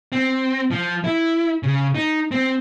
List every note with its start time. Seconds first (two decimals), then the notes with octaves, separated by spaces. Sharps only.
0.12 C4
0.71 F3
1.04 E4
1.63 C#3
1.95 D#4
2.31 C4